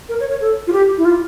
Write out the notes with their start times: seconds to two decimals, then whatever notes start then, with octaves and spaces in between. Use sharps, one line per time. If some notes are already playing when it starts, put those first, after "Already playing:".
0.09 A#4
0.20 C#5
0.31 C#5
0.41 A4
0.67 F4
0.72 G4
0.98 E4
1.05 F4